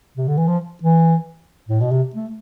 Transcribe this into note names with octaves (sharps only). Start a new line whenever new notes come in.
C3
D3
E3
F3
E3
A2
B2
C3
A3